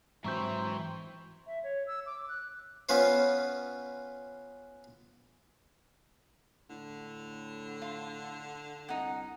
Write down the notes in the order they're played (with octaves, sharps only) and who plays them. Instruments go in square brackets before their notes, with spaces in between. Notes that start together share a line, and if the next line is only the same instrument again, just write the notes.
[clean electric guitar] G#2 F#3 [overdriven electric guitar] E3 E5 [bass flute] C4 [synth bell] A#5 C#6 G6
[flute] E5
C#5
E6
D6
F#6
[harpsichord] B3 C#4 F4 B4 C5
[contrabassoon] A2 [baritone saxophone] D3
[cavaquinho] F4
[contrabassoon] C2 [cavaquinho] D#4 F#5